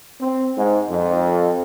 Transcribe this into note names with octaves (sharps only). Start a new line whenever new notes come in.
C4
G#2
F2